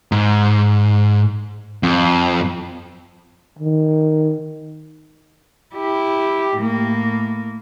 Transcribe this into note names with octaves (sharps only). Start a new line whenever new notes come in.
G#2
F2
D#3
E4 G4
A2 A#3